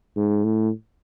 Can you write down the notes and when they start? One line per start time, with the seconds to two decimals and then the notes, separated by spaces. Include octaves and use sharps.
0.16 G#2
0.44 A2